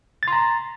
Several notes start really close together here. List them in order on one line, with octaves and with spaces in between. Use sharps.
A6 C6 A#5